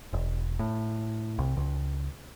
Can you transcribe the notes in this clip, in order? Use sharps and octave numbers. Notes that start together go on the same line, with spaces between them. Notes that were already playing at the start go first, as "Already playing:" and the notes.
E1
A2
C2
C#2